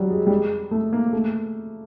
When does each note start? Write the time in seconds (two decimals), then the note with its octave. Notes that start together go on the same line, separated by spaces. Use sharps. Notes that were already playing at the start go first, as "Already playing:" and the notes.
Already playing: F#3 G3
0.10 G#3
0.27 G3
0.30 G#3
0.71 A3
0.93 A#3
1.13 A3